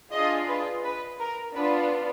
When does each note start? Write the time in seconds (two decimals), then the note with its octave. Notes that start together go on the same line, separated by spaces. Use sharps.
0.12 D4 F4 G#4 D#5
0.48 B4
0.85 B4
1.20 A#4
1.56 B3 D4 F4 B4